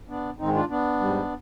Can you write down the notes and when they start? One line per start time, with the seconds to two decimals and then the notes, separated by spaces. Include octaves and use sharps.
0.09 B3 D4
0.39 G#2 D#3 G#3 C4 D#4
0.54 D4 F4
0.69 B3 D4
1.00 G#2 G3